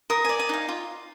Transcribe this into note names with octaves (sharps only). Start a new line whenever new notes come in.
A#4 D#6
D5 G#5
G#5
D#4 F5
F4